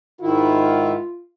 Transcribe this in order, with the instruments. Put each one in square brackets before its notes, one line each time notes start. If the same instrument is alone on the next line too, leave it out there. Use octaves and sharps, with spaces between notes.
[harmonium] G#2 D#3 E4 [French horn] F4